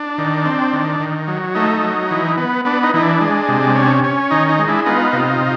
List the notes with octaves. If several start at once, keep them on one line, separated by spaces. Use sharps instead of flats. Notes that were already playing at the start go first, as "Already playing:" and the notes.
Already playing: D4
D#3
C4
D#3
D#3
F#3
A3 D#4
F#3
E3
B3
B3 D4
D#4
E3 D#4
D4
G#3
C3
C#4
C#4
D#3 D#4
D#4
G#3
D4 E4
B3 D#4 F4
C3
C3